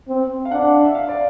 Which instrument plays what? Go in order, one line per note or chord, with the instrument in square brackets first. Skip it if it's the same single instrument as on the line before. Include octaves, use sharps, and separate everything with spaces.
[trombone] C4
[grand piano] F5
[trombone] D4 [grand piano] F#5
[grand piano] E5
F5
D5